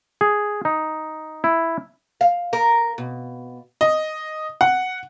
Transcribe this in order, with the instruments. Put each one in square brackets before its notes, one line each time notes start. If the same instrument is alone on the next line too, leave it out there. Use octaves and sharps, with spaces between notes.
[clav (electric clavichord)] G#4
D#4
E4
[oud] F5
A#4
B2
[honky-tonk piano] D#5
F#5